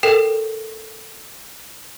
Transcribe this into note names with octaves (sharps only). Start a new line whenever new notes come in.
A4 A#4 G5 C7 E7